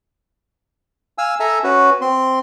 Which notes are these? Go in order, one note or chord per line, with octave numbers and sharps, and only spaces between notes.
F5 G#5 E6
A4 E5 G#5 A#5
C#4 F#4 B4
C4 C6